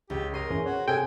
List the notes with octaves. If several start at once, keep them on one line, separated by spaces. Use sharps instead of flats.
C#2 G4
A#4 D#5 C6 D#7
E3 C#4
F#4 C#5
C3 G#4 A4 G5 G#5